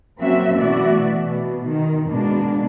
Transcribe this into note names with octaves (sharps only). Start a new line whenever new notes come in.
F#3 A#3 C4 C#4 F#4 E5
B2 E3 A3 F#4 D5 E5
B2
D#3
B2 G#3 A#3 D4